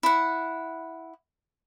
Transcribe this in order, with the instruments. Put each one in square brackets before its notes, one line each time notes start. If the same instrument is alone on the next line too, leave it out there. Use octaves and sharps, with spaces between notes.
[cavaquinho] E4 F#5